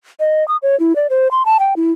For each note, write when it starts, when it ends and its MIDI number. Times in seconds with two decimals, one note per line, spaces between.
0.20 0.46 75
0.48 0.57 87
0.63 0.78 73
0.80 0.95 64
0.96 1.07 74
1.10 1.28 72
1.31 1.45 84
1.45 1.58 81
1.60 1.74 79
1.76 1.92 64